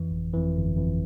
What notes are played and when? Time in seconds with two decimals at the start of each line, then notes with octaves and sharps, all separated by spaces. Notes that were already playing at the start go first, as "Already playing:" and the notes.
Already playing: F2 E3
0.11 G1
0.33 F2 E3
0.56 G1
0.77 F2 E3